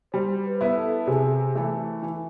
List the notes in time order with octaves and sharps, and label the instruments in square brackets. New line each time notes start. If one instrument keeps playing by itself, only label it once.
[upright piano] G3 [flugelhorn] C5
[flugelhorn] B4
[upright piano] B3 E4
[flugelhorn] A4
[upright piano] C3 [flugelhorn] G#4
[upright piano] E3 A3
E3